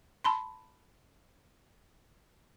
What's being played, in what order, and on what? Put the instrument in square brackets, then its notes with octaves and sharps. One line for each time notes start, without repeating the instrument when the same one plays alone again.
[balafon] A5 B5 C6